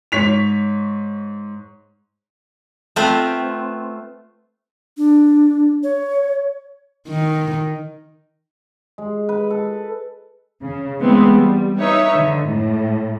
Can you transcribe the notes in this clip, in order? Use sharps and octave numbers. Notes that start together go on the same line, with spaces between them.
G#2 C#5 B6 F7
A3 B3 C4 F4 B4
D4
C#5
D#3
G#3
B4
A4
C#3
E3 G#3 A3 B3 C4
G3
D#4 B4 C#5 E5
D3
A2